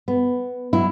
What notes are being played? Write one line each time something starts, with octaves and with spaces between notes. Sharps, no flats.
B3
F#3 E4